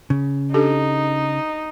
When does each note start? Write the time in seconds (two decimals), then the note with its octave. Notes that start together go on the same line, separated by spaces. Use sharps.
0.10 C#3
0.54 D4 D#4 G4 A4